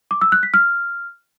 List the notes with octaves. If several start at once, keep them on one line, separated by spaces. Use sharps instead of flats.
D6
E6
F#6
B6
F6